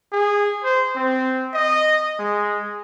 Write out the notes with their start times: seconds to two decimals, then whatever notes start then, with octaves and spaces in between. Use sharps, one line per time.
0.12 G#4
0.64 C5
0.96 C4
1.54 D#5
2.19 G#3